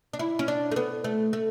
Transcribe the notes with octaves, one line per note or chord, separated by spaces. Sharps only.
D4
E4
C#4
D4
A3
B3
A3
A3